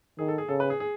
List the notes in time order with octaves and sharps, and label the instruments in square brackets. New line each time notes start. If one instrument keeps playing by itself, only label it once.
[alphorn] D#3 [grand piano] G#4
[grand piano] A4
G#4
[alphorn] C#3 [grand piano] A4
[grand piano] B4
G#4
G#4